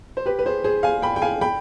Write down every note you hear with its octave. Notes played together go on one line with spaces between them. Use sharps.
C5
G4 B4
B4
G#4 C5
G#4 C5
F5 G#5
G5 B5
G5
F5 G#5
G5 B5